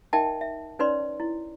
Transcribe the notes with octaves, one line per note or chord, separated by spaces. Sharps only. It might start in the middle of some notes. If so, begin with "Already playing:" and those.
D#4 A#4 D#5 E5 G5 A5
E5
C#4 D#4 B4 C#5 D5 C6
E4